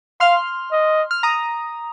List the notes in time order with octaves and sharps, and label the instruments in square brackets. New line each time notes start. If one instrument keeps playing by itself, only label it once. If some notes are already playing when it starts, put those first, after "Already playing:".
[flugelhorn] F5 [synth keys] C6 F6
[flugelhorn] D#5
[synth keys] F6
A#5 D#6